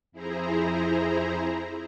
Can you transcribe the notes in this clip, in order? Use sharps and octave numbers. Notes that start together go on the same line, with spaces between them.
F2 E4 G#4 C5 A#5